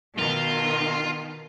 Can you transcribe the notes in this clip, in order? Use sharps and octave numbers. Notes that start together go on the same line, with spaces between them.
B2 D#3 F4